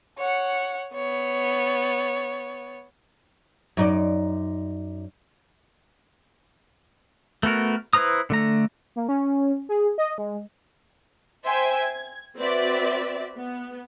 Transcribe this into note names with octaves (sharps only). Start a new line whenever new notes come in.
C#5 F#5
B3 C#5
F#2 D#4 D5
A3 B3 F#4 A#4
E4 B4 C5 A#5 D#6
D3 A3 A#5
A#3
C#4
G#4
D#5
G#3
C5 E5 G5 G#5 C6
G#6
C4 F#4 B4 D5 E5
B3